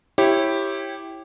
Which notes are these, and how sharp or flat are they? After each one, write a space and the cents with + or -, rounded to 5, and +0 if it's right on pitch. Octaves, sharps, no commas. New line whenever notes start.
E4 +0 G4 +0 C#5 -25